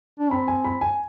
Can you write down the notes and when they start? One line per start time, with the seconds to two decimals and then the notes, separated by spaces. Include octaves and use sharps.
0.19 D4
0.31 C4 B5
0.48 G#5
0.64 B5
0.81 G#5